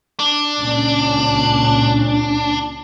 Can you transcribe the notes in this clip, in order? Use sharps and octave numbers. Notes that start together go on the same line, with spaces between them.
D4
C#2 A#2 C#4